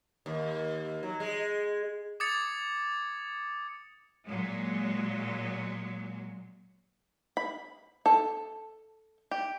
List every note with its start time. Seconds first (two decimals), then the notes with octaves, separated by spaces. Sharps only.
0.26 D#2
1.03 F#3
1.20 G#3
2.20 D6 D#6 G#6 A6 C#7
4.26 A#2 F#3 G#3
7.37 B5
8.06 A4
9.31 G4